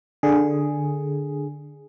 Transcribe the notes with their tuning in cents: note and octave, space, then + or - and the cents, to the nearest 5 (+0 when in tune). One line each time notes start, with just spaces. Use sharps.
D3 +10 G#4 +0